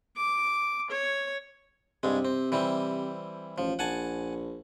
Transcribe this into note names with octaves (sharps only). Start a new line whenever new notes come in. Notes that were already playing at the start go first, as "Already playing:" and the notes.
D6
C#5
G2 C3 G#3
C4
E3 G3 C4
A1 F3
A#1 F#5 G#5 A5